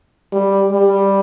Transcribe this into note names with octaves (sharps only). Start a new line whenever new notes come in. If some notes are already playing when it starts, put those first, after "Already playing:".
G3
G3